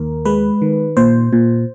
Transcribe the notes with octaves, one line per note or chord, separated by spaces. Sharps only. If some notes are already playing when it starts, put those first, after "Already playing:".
Already playing: D#2 A#4
G#3 B4
D#3
A#2 C5
A#2